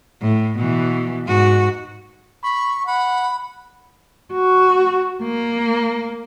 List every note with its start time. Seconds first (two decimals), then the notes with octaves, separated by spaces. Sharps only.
0.22 A2
0.58 B2 E3
1.26 G#2 F#4
2.43 B5 C#6
2.87 F#5 B5
4.33 F#4
5.23 A#3